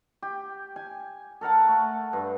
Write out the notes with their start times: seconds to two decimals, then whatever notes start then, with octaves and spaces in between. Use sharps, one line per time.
0.22 G4
0.76 G#5
1.41 A4 A#4 F#5 A5
1.68 A3
2.13 G2